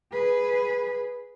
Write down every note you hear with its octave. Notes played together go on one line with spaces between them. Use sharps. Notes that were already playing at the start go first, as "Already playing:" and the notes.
G#4 B4